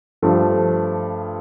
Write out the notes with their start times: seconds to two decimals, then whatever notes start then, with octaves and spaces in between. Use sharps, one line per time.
0.22 G2 F3 A3